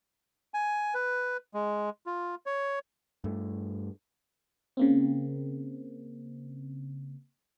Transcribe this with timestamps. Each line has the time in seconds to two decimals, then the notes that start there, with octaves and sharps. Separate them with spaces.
0.54 G#5
0.94 B4
1.54 G#3
2.06 F4
2.46 C#5
3.24 G2 A3
4.77 C#3 A#3 C4